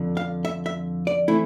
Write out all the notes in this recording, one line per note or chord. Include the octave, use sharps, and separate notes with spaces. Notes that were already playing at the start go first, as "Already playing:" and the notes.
Already playing: F2 D3 D4
F5
E5
E5
D5
E3 A3 C4 E4